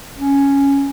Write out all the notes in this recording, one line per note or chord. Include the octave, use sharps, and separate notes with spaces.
C#4